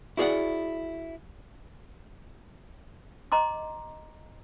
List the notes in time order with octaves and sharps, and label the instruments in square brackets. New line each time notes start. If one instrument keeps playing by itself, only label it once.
[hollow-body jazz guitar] E4 F#4 G#4 C#5 D5 F#5
[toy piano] D#5 A#5 C6 D6